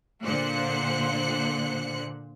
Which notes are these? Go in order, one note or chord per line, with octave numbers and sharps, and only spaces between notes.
A#2 D3 C5 F#6 C#7